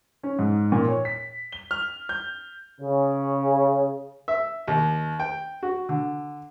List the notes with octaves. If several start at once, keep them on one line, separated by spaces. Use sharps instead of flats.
C#4
G#2
A#2
C#5
B6
G7
F6
G6
C#3
E5
D#2
G5
F#4
D3